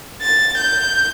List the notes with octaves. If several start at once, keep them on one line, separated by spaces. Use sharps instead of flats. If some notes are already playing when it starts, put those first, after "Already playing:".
A6
G6